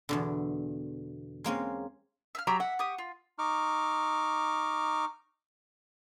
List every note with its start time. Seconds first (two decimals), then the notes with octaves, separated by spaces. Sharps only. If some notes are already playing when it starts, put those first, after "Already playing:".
0.09 E2 B2 D3
1.44 G#3 A#3 C4 C#4
2.35 E5 F5 F6
2.47 F#3 G4 A#5 B5
2.60 E5 F#5
2.79 G4 C#6 D#6
2.98 F4
3.39 D#4 C#6 D6 F6